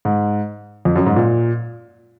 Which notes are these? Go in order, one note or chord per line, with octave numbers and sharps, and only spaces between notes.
G#2
F2
F#2
G#2
A#2